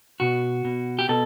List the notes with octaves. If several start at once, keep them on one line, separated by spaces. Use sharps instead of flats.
B2 F#4
B2
G4
B2 A4